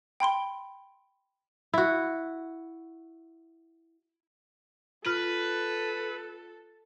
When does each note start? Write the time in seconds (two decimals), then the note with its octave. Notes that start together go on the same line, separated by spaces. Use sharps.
0.20 G5 B5 C6 G7
1.74 E4 F#4
5.06 F4 A4 B4 F6